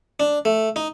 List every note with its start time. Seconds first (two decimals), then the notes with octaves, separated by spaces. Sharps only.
0.20 D4
0.45 A3
0.76 D#4